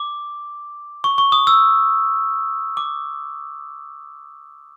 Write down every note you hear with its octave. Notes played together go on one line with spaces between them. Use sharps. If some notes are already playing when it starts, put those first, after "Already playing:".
Already playing: D6
C#6
C#6
D#6
E6
D6